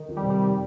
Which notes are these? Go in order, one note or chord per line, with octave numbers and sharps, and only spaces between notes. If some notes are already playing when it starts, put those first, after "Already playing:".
Already playing: D#3
F2
G3
C3
G3